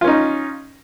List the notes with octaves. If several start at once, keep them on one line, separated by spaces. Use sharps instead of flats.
C#4 D#4 F4